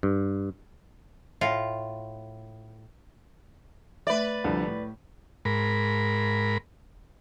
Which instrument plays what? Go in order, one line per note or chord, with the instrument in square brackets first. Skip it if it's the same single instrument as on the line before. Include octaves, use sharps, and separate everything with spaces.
[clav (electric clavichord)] G2
[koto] A2 F4
[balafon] A3 E5 [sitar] B4 D5
[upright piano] C2 D3 F3
A2
[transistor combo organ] G#2 A#4 B5